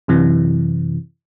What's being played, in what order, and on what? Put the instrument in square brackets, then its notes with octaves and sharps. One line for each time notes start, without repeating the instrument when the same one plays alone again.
[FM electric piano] F#2 C3 E3